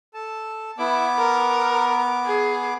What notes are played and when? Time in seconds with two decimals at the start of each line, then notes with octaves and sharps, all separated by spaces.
0.14 A4 A5
0.78 B3 E4 D6
1.18 A#4
2.25 G#4